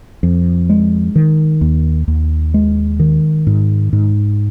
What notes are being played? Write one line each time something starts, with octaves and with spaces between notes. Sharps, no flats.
F2
G#3
D#3
D#2
D#2
G#3
D#3
G#2
G#2